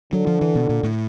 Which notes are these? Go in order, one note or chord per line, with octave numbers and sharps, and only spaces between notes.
D3 F#3
F3
E3
B2
A#2
A2